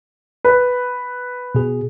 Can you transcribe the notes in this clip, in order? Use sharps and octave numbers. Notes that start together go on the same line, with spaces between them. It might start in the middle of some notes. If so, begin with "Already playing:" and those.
B4
B2 G#4